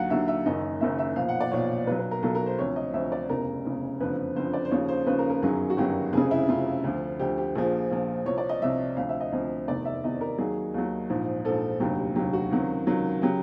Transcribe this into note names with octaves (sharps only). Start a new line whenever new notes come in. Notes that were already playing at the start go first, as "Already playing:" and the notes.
Already playing: D#2 D3 F#3 F5 F#5
D#2 D3 F#3 E5
E5
F#1 F#2 D#3 D#5
F#1 F#2 D#3 E5
E5
B1 A#2 F3 F5
F#5
D5
B1 A#2 F3 C#5
B1 B2 F#3 B4
B4
A#4
B1 B2 F#3 A4
A#4
C5
D2 C3 F3 C#5
D#5
D2 C3 F3 E5
D5
F1 E2 C#3 A#4
F1 E2 C#3
F#1 F2 D3 F3 B4
F#1 F2 D3 F3 C5
D5
C5
D#2 C#3 F3 C#5
C5
D#2 C#3 F3 B4
A#4
A#4
G1 F#2 D#3 F#3 G#4
F#4
G1 F#2 D#3 F#3 G4
F1 F2 C#3 G#4
E4
F1 F2 C#3 F4
D2 D3 F3
D2 D3 F3 G4
G4
A#1 A#2 F3 G#4
A#1 A#2 F3
C2 C3 F3 C#5
D5
D#5
C2 C3 F3 E5
D2 C3 F3 F5
E5
D#5
D2 C3 F3
F1 E2 C3 D#3 D5
E5
F1 E2 C3 D#3 D#5
A#4
D#2 D#3 F#3 G#4
D#2 D#3 F#3
A#1 G#2 F3
A#1 G#2 F3 A4
F1 D#2 D3 F#3 G4
F1 D#2 D3 F#3 G4
F#4
C#2 C3 D#3 F#3
C#2 C3 D#3 F#3
C#3 F#3 G4